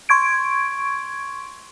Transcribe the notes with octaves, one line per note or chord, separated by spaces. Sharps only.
C6 C#6 G#6 D7